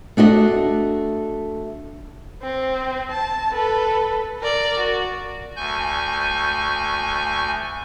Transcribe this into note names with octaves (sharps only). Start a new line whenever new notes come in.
A3 D4 F#4 D#5
C4
A5
A4 B4
A#4 D5
F#4
D2 G#5 C#6 G6